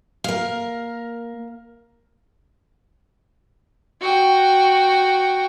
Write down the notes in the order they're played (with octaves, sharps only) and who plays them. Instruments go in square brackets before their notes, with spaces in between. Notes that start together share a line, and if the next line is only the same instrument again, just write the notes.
[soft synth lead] A#3 [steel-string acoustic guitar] A#4 F5
[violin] F#4 G5